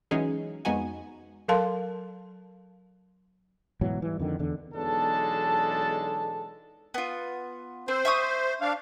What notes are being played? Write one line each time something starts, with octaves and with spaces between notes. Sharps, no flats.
E3 F#3 G#3 C#4 D#4 G#4
F2 G#3 B3 D#4 F#4 G#5
F#3 A4 A#4 F5 A5 C6
G#2 B2 E3 F#3
E3 G3
F2 D3 D#3
E2 D3
B1 E2 G#3 D4 A4 A5
B3 F4
C4 C5
E5 C#6 D#6
D4 F5